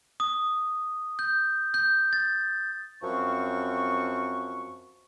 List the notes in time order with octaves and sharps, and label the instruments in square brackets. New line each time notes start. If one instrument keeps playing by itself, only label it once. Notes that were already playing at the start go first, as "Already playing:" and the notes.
[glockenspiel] D#6
G6
G6
A6
[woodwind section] F#2 F3 C4 C#6